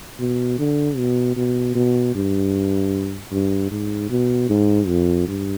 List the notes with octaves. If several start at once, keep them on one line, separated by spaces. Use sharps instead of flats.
B2
D3
B2
B2
B2
G2
G2
G#2
B2
G#2
F2
G2